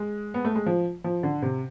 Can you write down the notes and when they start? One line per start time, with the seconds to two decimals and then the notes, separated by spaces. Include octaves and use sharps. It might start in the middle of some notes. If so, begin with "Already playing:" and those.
Already playing: G#3
0.34 B3
0.45 A3
0.55 G#3
0.66 F3
1.04 F3
1.23 D3
1.42 C3